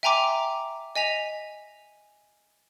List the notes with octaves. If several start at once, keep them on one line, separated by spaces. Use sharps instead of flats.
E5 G5 G#5 A#5 C6 D6
D#5 G#5 B6 F7